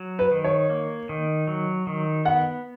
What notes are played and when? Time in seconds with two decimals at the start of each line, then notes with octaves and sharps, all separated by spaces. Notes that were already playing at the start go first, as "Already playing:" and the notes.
Already playing: F#3
0.19 B4
0.31 D#3
0.44 C#5
0.70 A#3
1.09 D#3
1.47 F#3
1.87 D#3
2.25 B3 F#5